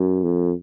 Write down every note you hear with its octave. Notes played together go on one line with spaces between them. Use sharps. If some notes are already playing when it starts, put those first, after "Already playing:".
Already playing: F#2
F2